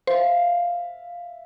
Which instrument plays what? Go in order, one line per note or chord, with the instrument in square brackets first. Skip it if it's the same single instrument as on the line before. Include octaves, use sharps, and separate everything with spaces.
[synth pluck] C5 [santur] E5 F5